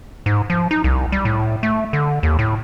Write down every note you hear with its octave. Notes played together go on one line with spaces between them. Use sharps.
G#2
F3
D#4
C2
G3
A2
A3
D3
D#2
A2